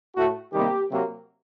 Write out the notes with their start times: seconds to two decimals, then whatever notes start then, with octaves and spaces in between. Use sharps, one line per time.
0.16 A2 A3 F#4
0.52 C3 D#3 G3 A#3 G4
0.89 C3 F#3 A#3